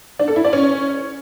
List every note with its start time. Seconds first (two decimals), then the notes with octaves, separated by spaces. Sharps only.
0.19 D4
0.28 A4
0.36 E4
0.44 D5
0.53 C#4